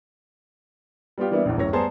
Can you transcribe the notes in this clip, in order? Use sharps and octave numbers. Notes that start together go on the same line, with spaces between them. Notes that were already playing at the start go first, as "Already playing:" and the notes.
G3 B3 F4 G4
E3 G3 A#3 B3 D4 E4
A#1 E2
D1 F#2 A2 C#5 A#6
G3 B3 G#4 C5 A5 A#5